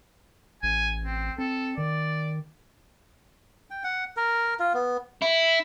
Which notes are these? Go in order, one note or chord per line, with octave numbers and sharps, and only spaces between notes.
A1 G#5
C4
C4 A4
D#3 D5
G5
F#5
A#4
F4
B3
E4